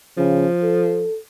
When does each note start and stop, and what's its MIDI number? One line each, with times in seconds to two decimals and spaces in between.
0.18 0.47 49
0.18 1.06 53
0.63 1.18 69